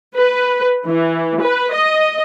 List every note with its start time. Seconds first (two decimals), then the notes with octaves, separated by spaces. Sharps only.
0.16 B4
0.86 E3
1.41 B4
1.72 D#5